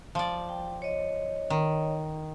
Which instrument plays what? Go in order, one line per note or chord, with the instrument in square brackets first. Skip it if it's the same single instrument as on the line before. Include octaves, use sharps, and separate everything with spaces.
[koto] F3 D5
[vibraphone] G5
C#5 D#5
[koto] D#3